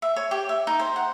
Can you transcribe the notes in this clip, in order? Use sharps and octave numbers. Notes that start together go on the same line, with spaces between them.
E5
C#5
G4
E5
D#4
C5
F#5